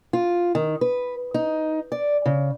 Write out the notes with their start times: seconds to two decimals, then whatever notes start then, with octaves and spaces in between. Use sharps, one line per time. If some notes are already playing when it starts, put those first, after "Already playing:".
0.13 F4
0.55 D#3
0.81 B4
1.34 D#4
1.92 D5
2.26 C#3